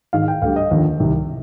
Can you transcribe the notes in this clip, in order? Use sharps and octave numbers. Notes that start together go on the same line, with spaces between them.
G#2 D#3 G#3 F5
G5
D2 D3 G3 F5
D#5
D#2 D3 F3
C2 C3 D#3